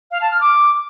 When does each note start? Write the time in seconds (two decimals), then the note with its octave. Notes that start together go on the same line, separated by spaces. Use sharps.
0.11 F5
0.21 A5
0.31 F6
0.40 D6